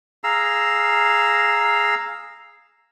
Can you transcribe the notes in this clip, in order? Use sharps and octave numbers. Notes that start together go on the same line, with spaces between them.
G#4 F5 A#5 E6